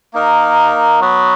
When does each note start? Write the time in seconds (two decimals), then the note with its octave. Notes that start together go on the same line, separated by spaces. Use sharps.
0.13 A#3 D#4 A#4
1.01 F#3 B3 F#4 B4